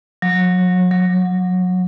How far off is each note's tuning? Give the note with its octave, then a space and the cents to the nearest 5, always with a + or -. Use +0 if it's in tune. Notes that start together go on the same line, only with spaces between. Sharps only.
F#3 -35
F#3 -25